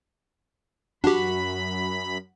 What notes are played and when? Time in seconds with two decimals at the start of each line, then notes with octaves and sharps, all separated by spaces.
1.04 F#2 D4 F#4 G4 B5